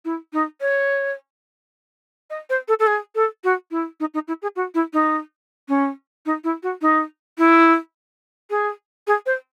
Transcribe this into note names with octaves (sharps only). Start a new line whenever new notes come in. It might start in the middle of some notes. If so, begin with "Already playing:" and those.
E4
D#4
C#5
D#5
C5
A4
A4
G#4
A4
F#4
E4
D#4
D#4
E4
G#4
F#4
E4
D#4
C#4
D#4
E4
F#4
D#4
E4
G#4
G#4
C5